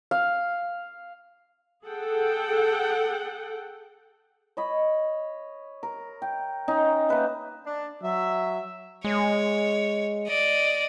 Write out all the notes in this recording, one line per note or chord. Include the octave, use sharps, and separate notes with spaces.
F5
G#4 A4 F#5 G5
C#5 D#5 B5
A#4
G5
C#4 D#4
A#3 D#4 B4 E5
D4
F#3 E5
G#3 C#5
D5 D#5